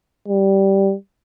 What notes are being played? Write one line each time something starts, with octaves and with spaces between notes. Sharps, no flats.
G3